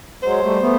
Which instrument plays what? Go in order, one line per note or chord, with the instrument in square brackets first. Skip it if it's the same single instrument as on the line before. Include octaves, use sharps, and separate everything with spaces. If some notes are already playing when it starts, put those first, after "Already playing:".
[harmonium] F#3 G#3 [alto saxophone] C5
[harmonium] G3 A3
A3 B3